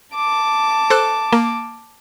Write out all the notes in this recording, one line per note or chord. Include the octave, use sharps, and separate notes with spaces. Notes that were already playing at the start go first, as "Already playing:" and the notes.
A5 D6
A4 C5 F#6
A#3